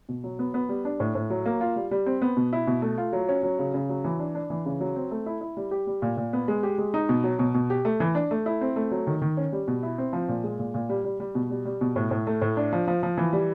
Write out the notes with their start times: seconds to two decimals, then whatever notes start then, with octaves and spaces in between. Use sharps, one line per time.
0.09 B2
0.24 F#3
0.39 B3
0.54 B3
0.69 G3
0.85 D4
1.00 A2
1.15 A2
1.30 F#3
1.46 A#3
1.61 F4
1.76 G3
1.91 G3
2.06 C4
2.22 B3
2.37 B2
2.53 E4
2.67 B2
2.82 A3
2.98 F4
3.13 F#3
3.29 C#4
3.43 F#3
3.59 C#3
3.74 C#3
3.89 F#3
4.04 E3
4.19 D4
4.35 D4
4.50 E3
4.66 C#3
4.80 F#3
4.96 C4
5.11 A3
5.26 E4
5.41 E4
5.57 G3
5.71 G4
5.87 G3
6.02 A#2
6.17 A#2
6.33 B3
6.48 G#3
6.63 G4
6.78 G#3
6.94 D#4
7.09 B2
7.24 F#3
7.39 B2
7.54 B2
7.70 G4
7.85 A3
8.00 E3
8.15 D4
8.31 A3
8.46 E4
8.61 C4
8.76 A3
8.91 F#3
9.07 D#3
9.22 D#3
9.37 C#4
9.52 G3
9.68 B2
9.83 E4
9.98 C4
10.13 F3
10.29 A#2
10.44 G#3
10.59 A#2
10.74 A#2
10.89 G3
11.05 G3
11.20 G3
11.35 B2
11.50 G3
11.65 G3
11.81 B2
11.96 A2
12.11 A2
12.27 A3
12.41 A2
12.57 D4
12.73 F3
12.87 F3
13.03 F3
13.17 E3
13.33 G3